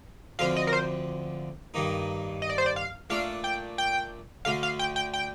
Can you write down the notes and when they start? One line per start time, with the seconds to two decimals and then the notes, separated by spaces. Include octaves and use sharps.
0.39 D2 D3 F3 C4 F5
0.56 D#5
0.67 A#4
0.73 C5
1.74 G2 D#3 A#3 D#4
2.42 D#5
2.49 D5
2.58 C5
2.66 D5
2.76 F5
3.10 A#2 A3 D4 A4 F5
3.44 G5
3.78 G5
4.45 D2 D3 A3 F5
4.63 F5
4.79 G5
4.96 G5
5.14 G5